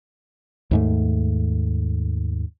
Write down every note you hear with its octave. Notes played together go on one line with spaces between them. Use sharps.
D#2 G#2 A3